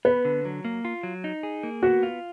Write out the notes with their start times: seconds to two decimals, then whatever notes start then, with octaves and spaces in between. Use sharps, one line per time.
0.05 B3 B4
0.25 D3
0.45 F#3
0.65 A#3
0.85 F4
1.03 F#3
1.24 D#4
1.43 G#4
1.63 A#3
1.83 B3 F#4
2.03 F4